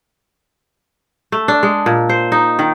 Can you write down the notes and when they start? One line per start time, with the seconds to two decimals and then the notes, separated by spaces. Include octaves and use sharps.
1.32 A3
1.48 D4
1.63 G#3
1.86 A#2
2.09 C5
2.32 D#4
2.59 D#3